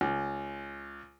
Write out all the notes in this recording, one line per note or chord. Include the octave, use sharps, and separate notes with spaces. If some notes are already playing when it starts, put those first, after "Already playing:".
C#2